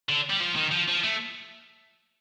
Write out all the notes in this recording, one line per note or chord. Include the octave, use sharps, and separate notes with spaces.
D3
G3
F3
D#3
F3
F3
A3